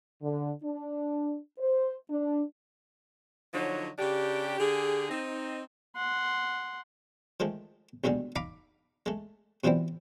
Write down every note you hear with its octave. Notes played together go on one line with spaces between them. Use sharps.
D3
D4
C5
D4
D3 F3 F#3 D#4 C#5
C#3 D4 G4
D3 G4 G#4
C4 D#4
F#5 C6
D#3 F3 G#3 A3
D#2 B2 D3 G3 G#3
D#4 F5 A#5 B5 D6
G#3 A3
B2 E3 F3 G3 C4 E4